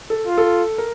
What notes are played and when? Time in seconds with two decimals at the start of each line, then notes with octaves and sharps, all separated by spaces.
0.10 A4
0.27 F4
0.38 A4
0.78 A#4